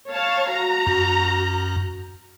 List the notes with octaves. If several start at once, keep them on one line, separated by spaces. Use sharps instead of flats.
C#5 F5 A5
F#4 A#5
F#2